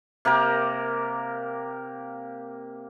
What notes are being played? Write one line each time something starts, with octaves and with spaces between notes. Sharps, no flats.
C3 A#3 G4 A#4